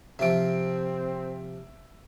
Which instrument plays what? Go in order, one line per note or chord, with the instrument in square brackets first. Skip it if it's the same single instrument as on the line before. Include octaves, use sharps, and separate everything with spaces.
[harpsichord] C3 F3 [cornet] C4 [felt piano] E5 D7